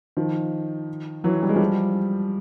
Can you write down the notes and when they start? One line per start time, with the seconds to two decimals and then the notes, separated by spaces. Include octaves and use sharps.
0.17 D#3 F3
1.24 E3 F#3
1.43 G3
1.49 G#3
1.56 F3 G3